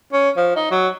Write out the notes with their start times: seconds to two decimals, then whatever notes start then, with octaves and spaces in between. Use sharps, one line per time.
0.13 C#4
0.37 F3
0.56 D#4
0.71 F#3